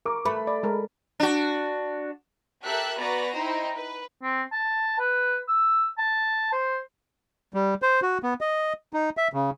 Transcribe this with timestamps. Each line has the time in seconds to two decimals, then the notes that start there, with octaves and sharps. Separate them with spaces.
0.06 A#4 C#6 D6
0.25 A3 B4 B5
0.47 D5
0.63 G#3 A4 A#4
1.20 D4 F#4
2.65 G4 A4 A#4 E5 E6 F#6
2.98 B3 F#4 B4 D5 G#5 A#5
3.35 D#4 E4 C5 D#5 G5
3.76 B4
4.23 C4
4.52 A5
4.99 B4
5.48 E6
5.98 A5
6.52 C5
7.54 G3
7.82 C5
8.02 F#4
8.23 B3
8.41 D#5
8.93 D#4
9.17 E5
9.33 C#3